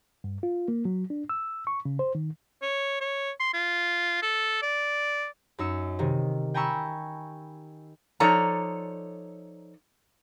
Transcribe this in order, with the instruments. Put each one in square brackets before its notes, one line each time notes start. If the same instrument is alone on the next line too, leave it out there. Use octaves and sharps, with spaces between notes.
[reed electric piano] G2
F4
A#3
F#3
D4
E6
C#6
C#3
C5
D#3
[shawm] C#5
C#5
C6
F4
A4
D5
[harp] F#2 D#4 E6 C#7
C3 D#3
G5 G#5 A#5 B5 C#6 E6
[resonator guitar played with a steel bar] F3 D#4 A4 C#5 D5 A#5